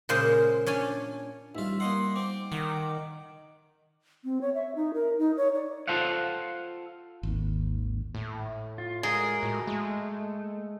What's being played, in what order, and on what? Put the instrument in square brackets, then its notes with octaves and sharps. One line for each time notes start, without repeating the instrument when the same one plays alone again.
[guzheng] A#2 C#3 G#3 C5
C#4 D4 C#5 G#5
[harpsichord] A1 F4 [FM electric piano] G3 D#4 [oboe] E5
[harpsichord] A#3 D#5 F#5 [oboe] C6
[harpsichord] C4 [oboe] D6
[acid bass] D#3 [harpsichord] F#5
[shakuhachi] C4
C#5
E5
D#4
A#4
D#4
C#5
D5
[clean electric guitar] F4 A4 C5 F5 F#5
[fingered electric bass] G#1 D#2
[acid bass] A2
[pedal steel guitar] F4
[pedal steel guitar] G#3 F#4 A#4 [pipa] G#4
[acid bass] A2
[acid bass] G#3 [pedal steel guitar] A3